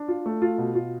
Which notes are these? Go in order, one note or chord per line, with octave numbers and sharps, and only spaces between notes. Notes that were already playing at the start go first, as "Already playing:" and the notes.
Already playing: D4
F4
A3
F4
B2
F4